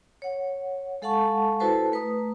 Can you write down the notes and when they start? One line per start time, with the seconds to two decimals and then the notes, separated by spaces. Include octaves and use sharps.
0.22 C#5 F#5
1.02 G#3 A4 F5 F#5 A5 C#6
1.60 E4 F#4 A4 B4 C5 A5
1.92 A3 B4 A#5 D#6